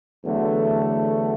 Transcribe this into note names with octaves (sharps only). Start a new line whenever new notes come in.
E2 D3 F#3 A3